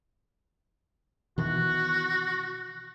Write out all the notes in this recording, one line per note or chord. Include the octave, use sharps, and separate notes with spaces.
B2 D#3 E3 F#4